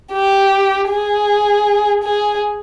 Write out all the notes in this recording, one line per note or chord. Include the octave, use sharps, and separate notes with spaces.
G4
G#4
G#4